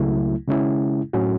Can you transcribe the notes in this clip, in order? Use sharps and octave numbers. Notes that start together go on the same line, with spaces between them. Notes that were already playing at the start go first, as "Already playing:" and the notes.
Already playing: C#2 C#3 F#3 A3 E4
C#3 G#3 C#4 E4
A2 F#3 C#4 F#4